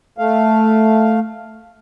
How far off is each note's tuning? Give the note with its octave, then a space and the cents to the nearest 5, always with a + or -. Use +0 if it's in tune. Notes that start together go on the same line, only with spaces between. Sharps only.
A3 +0 F5 +0